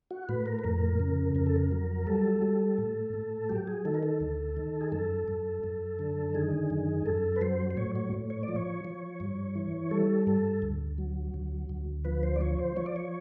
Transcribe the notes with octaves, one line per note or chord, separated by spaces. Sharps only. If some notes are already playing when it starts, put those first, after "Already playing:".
F#4
A2 B4
A#4
B4
F2 A#4
C#3
F2 A#4
A4
A#4
F#3
G3 A4
G3
A2
A2
F#3 G4
G#4
D#3 A4
A#4
A4
D2
D#3
G#4
F#2 A4
F#2
F#2
D3
D#3 G#4
F#2
F#2 A4
B4
F#3 C5
C5
A2 C#5
C#5
A2
C#5
D5
F3
C#5
F3
G2
E3
G3 A4
G2 A4
D2
F#3
D2
D2
F3 B4
C5
D5
F3 C#5
C5
F3 C#5
D5
C#5